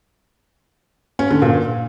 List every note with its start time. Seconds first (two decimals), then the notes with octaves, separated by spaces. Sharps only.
1.19 C#4
1.30 D3
1.42 A#2